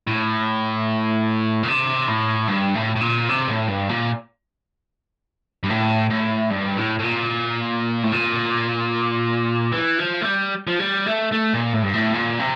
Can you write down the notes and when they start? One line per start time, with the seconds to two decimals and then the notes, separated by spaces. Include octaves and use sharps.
0.07 A2
1.63 A#2
1.68 C3
2.08 A2
2.48 G2
2.75 A2
2.96 A2
3.01 A#2
3.29 C3
3.48 A2
3.68 G2
3.89 A#2
5.63 G2
5.70 A2
6.10 A2
6.50 G2
6.77 A2
6.99 A2
7.04 A#2
8.03 A2
8.12 A#2
9.73 E3
9.99 F3
10.22 A3
10.25 G3
10.67 F3
10.79 G3
11.07 A3
11.32 A3
11.54 A#2
11.73 A2
11.83 G2
11.94 A2
12.14 A#2
12.39 C3